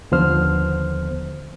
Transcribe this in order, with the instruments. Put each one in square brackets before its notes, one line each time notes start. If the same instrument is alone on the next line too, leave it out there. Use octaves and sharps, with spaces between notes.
[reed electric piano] D#2 D3 F3 B3 C5 F6